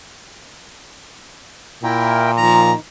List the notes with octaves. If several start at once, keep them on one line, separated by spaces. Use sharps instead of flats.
A#2 E4 A#4 G5
D#3 F3 A#5